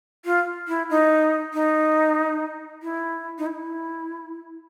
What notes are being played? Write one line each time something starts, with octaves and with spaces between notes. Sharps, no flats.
F4
E4
D#4
D#4
E4
D#4
E4